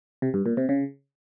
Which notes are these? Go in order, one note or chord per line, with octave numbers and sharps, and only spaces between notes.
C3
G2
A#2
C3
C#3